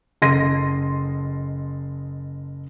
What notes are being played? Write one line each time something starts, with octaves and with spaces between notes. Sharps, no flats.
F#1 A4 D#5 C6 A#6 D#7